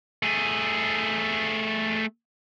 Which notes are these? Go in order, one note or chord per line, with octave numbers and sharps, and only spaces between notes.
A3 G#4